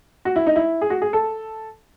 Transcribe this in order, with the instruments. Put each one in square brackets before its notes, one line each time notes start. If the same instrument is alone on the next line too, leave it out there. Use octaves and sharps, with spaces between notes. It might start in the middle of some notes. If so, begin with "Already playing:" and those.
[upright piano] F#4
E4
D#4
E4
G#4
F#4
G#4
A4